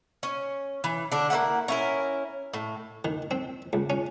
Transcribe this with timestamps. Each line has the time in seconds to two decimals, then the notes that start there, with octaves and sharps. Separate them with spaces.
0.23 C#4
0.84 E3
1.12 D3 D4
1.30 A#3 C#4 E4 F#5
1.68 C#4 E4 A#4
2.53 A2
3.05 D#3
3.31 C4
3.73 C#2
3.90 C#4